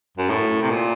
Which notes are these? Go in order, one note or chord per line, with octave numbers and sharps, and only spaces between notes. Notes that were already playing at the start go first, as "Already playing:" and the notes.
F#2
A2
C3
A#2